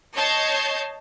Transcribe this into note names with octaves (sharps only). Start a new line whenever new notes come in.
C#5 D#5 A5 G6 G#6 C7